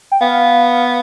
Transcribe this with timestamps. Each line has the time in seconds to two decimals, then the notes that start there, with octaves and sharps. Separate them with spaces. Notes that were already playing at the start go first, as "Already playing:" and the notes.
0.12 G5
0.21 B3 F5